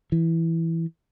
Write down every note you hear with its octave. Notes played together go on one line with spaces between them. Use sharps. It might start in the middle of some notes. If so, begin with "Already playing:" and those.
E3